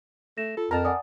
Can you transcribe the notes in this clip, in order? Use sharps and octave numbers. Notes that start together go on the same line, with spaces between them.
A3 A#6 E7
F4 A4
F2 A#4 A5 A#5
D5 F#5 G#5 D#6